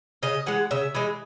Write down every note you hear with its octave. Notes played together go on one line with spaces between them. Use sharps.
C#3 D#5
E3 G#3 F#5
C#3 E5
E3 G#3